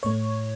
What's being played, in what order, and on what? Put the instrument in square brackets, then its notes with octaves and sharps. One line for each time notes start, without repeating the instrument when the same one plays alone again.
[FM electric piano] A2 A3 C#5